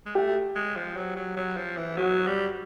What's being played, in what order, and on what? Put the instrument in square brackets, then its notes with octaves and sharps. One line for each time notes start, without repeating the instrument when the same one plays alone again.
[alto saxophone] G#3
[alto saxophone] A3 [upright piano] G4
[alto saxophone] G#3
F3
F#3
F#3
F#3
F3
E3
[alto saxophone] F#3 [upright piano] F#4
[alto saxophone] G3